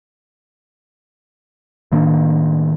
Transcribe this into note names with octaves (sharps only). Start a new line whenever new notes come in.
A2 D#3 A#3 D4